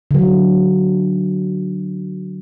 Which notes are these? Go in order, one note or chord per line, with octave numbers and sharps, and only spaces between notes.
D3 F#3